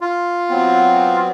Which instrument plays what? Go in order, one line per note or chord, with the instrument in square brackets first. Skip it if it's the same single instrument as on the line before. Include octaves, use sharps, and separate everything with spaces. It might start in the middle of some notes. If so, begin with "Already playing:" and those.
[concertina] F4
[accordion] F#3 B3 C4